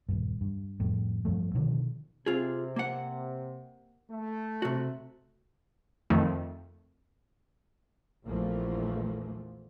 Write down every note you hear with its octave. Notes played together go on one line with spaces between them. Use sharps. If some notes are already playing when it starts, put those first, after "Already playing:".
D#1 G2
G2
F2 A2
G2 F3 A3
B2 D3 D#3 F3
C3 C4 F4 G#4
A#3 F#5
A3
C3 F#4
F2 D#3 A3
A#1 E2 E3 F3 A3 A#3